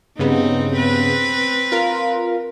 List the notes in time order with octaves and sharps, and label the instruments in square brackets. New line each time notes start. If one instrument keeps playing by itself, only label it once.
[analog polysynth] G2 C#3 B3 [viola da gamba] C4 D#4
[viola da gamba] C4 B4
[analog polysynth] F4 A#4